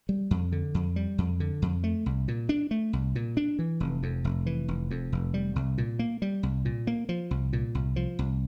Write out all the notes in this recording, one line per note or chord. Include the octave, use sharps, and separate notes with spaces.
G3
F2
D3
F2
G3
F2
D3
F2
A3
C2
A#2
D4
A3
C2
A#2
D4
E3
F1
F2
F1
E3
F1
F2
F1
G3
C2
A#2
A#3
G3
C2
A#2
A#3
F3
C2
A#2
C2
F3
C2